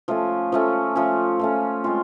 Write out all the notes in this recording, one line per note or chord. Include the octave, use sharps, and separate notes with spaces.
F3 A3 C#4
F3 A3 C#4
F3 A3 C#4
F3 A3 C#4
G#3 C4 F4